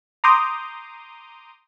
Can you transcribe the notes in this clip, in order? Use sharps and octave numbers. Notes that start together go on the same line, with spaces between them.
A#5 C6 D6 D#6 G6